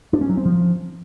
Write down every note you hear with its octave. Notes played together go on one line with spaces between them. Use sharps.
D4
C#4
F#3
C4
F3